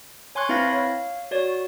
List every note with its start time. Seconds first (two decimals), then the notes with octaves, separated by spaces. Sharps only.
0.35 C#5 G#5 C6 C#6 F#6 G#6
0.49 C4 E4 B4 F5 A#6
0.69 C#5 F5
1.31 F#4 C#5 D5